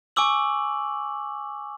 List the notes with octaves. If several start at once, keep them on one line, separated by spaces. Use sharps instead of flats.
G#5 C#6 D6 E6 F#7